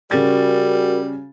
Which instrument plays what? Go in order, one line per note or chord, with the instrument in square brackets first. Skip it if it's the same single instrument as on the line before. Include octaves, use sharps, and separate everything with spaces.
[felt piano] C#3 A6 [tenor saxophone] G3 [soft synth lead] F#4 [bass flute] A#4